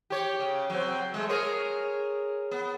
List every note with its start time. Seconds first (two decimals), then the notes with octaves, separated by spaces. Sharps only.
0.10 G4 C#5
0.40 C#3
0.70 F#3 C4
1.14 G#3 A3
1.29 G#4 A#4 C#5
2.51 B3